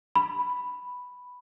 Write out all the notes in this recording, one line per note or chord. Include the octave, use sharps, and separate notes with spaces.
B5